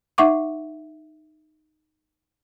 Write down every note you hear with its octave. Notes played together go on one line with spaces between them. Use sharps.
D#4 E5 F#5 C#6 D6